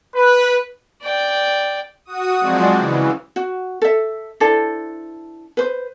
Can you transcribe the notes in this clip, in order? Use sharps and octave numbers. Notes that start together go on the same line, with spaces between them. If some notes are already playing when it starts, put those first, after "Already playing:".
B4
D5 G5
F#4 D#6
F3 F#3 G#3 C4 F#4 D5
C#3 E3
F#4
A4 E5
D4 E4 A4 C5
B4 C5